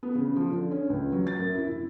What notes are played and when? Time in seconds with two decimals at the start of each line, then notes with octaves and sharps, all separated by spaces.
0.03 B3
0.15 C#3
0.36 F3
0.50 D3
0.71 C#4
0.90 C#2
1.12 F#3
1.27 A6
1.39 F#2
1.55 E4
1.68 C3